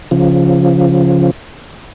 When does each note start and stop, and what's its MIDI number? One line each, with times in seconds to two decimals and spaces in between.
0.11 1.31 49
0.11 1.31 53